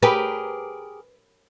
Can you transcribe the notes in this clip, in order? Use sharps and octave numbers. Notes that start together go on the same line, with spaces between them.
G4 G#4 A#4 B4